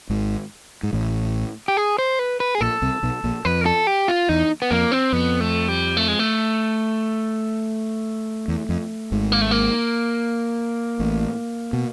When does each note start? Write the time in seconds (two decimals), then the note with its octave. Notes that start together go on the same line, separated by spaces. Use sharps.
0.09 G#1 G#2
0.83 G#2
0.93 A1 A2
1.68 G4
1.77 G#4
1.98 C5
2.19 B4
2.40 B4
2.55 G#4
2.60 A#1 A#2 A4
2.82 C2 C3
3.03 B1 B2
3.24 A#1 A#2
3.45 F2 B4
3.61 A#4
3.66 A4
3.87 G4
4.08 F4
4.29 E2 D#4
4.62 B3
4.71 F2 A#3
4.92 C4
5.13 F2 B3
5.41 A3
5.68 G3
5.97 A3
6.08 G#3
6.19 A3
8.48 E2
8.69 F2
9.12 G#1 G#2
9.32 A#3
9.41 A3
9.51 A#3
11.00 A1 A2
11.73 B2